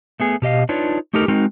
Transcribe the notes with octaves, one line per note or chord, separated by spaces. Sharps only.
A3 B3 G#4
B2 G4 D#5 F5
D4 D#4 F4 B4 C#5
A3 D#4 G4 A4 A#4
G#3 C4 D#4 F#4 A#4